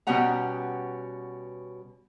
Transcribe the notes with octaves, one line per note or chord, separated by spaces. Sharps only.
B2 G3 B3 C#4 F#5 A#5